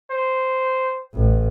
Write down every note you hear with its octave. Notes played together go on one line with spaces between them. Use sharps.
C5
A1